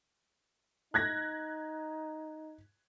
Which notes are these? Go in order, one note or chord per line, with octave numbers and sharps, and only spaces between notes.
D#4 F#6 G#6 A#6